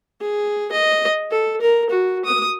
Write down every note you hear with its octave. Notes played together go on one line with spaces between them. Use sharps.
G#4
D#5
A4
A#4
F#4
D#6